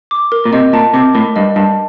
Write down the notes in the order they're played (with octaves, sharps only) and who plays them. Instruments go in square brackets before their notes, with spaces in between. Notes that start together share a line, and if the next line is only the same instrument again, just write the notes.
[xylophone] D6
A#4
[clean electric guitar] A#2
[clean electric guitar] C3 [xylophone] D#5
[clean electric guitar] A#2 [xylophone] A5
[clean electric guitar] C3 [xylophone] D6
[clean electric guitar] A2 [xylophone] A#4
[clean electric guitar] G2 [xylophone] D#5
[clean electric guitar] G2 [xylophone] A5